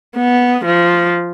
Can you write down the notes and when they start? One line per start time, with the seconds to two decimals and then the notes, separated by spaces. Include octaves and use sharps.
0.16 B3
0.65 F3